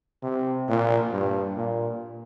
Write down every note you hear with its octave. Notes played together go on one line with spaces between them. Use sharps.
C3
A#2
G2
A#2